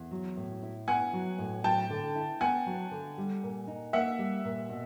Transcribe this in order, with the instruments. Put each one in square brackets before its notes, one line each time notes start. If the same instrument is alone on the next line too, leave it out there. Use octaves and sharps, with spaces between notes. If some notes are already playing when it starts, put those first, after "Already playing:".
Already playing: [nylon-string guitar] E2
F#3
A2
E4
[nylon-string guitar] B3 [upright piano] F#5 G#5
[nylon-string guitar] F#3
A2
[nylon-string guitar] F#3 [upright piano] G5 A5
[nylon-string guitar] D3
E4
[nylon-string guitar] B3 [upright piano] F#5 G#5
[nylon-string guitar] F#3
D3
G3
A#2
D#4
[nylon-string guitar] A#3 [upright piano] E5 F#5
[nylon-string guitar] G3
A#2
B2